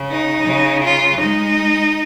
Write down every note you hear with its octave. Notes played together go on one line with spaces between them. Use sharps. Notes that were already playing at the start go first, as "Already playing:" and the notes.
Already playing: C#3
D#4
C#3
F4
G#3 D#4